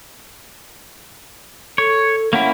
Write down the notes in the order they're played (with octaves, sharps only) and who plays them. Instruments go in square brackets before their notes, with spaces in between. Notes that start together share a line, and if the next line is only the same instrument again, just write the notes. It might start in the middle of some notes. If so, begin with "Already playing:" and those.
[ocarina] A4 [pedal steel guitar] C#5
[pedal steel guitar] A#3 C#4 E4 [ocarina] F#5